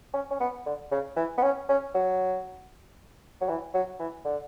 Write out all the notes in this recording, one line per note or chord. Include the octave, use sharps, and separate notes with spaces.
C#4
C#4
B3
D3
C#3
E3
B3
C#4
C#4
F#3
F#3
E3
F#3
E3
D3